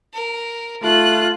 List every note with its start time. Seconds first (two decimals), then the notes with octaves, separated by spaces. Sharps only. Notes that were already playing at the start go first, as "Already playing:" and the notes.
0.14 A#4
0.83 A3 F4 F#6